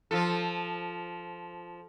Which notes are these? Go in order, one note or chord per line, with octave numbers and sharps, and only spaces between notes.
F3 F4 A4